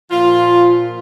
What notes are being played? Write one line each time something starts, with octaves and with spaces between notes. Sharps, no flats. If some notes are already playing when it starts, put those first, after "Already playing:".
A#2 F3 F4